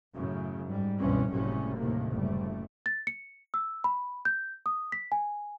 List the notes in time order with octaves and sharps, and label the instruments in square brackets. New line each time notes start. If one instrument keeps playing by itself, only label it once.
[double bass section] F#2 A2 C#3
G#2 G3
C#2 G2 B2 E3 C4 C#4
F#1 F#2 A2 C3 G3 C#4
D#2 A2 C3 A#3
F#1 G3 A3
[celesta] A6
C#7
E6
B5
G6
D#6
B6
G#5